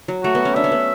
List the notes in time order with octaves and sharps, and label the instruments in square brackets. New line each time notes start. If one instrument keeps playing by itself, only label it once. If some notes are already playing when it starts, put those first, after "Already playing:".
[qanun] F#3
[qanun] A3 [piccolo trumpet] F#4
[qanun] B3
C#4
[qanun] D4 [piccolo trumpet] E5
[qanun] C#4
B3